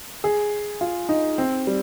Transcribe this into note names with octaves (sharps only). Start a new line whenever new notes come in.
G#4
F4
D#4
C4
G3